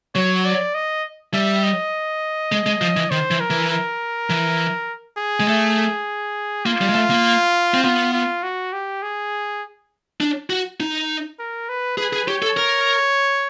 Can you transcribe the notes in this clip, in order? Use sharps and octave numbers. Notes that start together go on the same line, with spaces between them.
F#3 C#5
D5
D#5
G3 E5
D#5
G#3
G#3
F3
E3
D#3 C5
E3
A#4
E3
A#4
E3
G#4
G#3
A3
A#3 F4
G3
G#3
A3
A#3
C4
B3 F4
F4
F#4
G4
G#4
D4
F#4
D#4
A#4
B4
G#4 B4
G#4
G4 C#5
A4
A#4